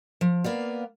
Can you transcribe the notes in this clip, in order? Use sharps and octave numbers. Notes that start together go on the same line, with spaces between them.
F3
A#3 B3 D5 F5